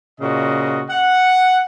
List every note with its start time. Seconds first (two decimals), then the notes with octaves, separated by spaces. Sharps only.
0.21 A#2 C#3 F#4 D#5
0.90 F#5